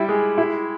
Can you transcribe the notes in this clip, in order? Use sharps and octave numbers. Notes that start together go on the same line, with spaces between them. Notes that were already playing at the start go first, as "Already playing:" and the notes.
Already playing: G3 E4
G#3
E4